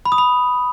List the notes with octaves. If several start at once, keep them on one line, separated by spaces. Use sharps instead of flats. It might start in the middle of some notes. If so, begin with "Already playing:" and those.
B5
D#6
B5